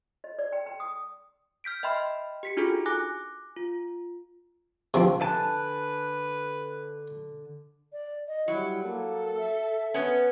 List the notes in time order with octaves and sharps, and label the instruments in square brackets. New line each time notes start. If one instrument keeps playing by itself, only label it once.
[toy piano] D#5
D5
G5
G5
D#6
[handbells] F6 G6 B6 D7
D#5 E5 G5 B5 C6 F6
G4 B6 C#7
D4 D#4 F4 F#4 G#4 A4
G#5 D6 F#6 A#6
F4
[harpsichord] C3 F3 C4
[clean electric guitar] D3 G#5 A5 [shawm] B4
[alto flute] D5
D#5
[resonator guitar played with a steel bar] F#3 [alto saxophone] G3 [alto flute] E4
[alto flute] A#3 [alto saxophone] A4
[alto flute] E5
[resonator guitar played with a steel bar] B3 C#4